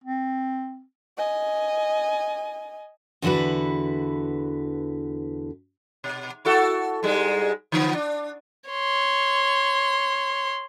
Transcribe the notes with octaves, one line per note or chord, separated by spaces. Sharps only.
C4
D#5 G#5
E2 D3 E4 F#4 B4
B2
E4 F#4 A4
G#2 G3 G#3
D3 F3 B3
D4
C#5 C6